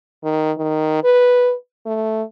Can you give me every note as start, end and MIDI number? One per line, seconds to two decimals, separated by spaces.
0.24 0.52 51
0.58 1.02 51
1.04 1.54 71
1.86 2.23 57